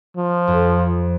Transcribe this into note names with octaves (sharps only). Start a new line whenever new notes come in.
F3
F2